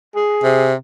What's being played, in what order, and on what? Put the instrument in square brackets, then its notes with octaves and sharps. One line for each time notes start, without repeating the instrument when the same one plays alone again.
[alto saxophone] G#4
[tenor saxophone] C3